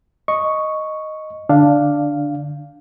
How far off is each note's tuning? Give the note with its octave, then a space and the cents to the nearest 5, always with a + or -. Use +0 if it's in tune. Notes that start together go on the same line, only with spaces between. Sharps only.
D#5 +0 C#6 +0
D3 +0 D4 +0 F5 +0